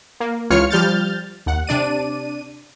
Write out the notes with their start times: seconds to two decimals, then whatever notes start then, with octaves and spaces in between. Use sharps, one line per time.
0.20 A#3
0.50 C#2 E3 F4 C#5 F6 C#7
0.70 F3 G3 F6 G6 A6
1.46 D#2 F#5
1.67 C3 D4 D5 D#7